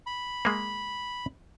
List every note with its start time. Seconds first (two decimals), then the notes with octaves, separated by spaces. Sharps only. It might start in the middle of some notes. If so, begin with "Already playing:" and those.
0.07 B5
0.45 G#3 A#3